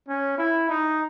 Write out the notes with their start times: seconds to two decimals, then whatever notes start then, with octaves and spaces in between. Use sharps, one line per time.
0.08 C#4
0.38 E4
0.69 D#4